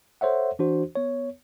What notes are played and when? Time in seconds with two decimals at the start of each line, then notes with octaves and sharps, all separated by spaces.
0.21 A4 C5 C#5 E5 F#5
0.59 E3 D4 F#4 C5
0.95 B3 C#5